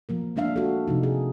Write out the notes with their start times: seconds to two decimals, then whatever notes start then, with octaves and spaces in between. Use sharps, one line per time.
0.09 F3 A#3 A#4
0.36 G#3 A#3 D4 E5 F5
0.56 F#4 A4
0.87 C3 F3 D#4
1.03 G#4